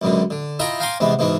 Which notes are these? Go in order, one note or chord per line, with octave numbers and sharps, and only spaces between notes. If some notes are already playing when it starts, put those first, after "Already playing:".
C#2 F#2 B2 D3
D3
E4 F4 D#5 E5 G5 A#5
F5 G5 G#5 A#5 C6 D6
E2 C3 G#3 B3
G#2 B2 E3 G#3